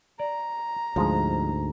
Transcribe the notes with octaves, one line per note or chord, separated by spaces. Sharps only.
D5 A#5
D2 G#2 F3 G#3